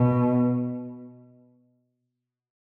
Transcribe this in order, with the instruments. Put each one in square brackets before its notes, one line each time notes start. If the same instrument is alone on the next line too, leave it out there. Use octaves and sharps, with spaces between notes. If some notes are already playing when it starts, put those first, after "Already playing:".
Already playing: [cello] B2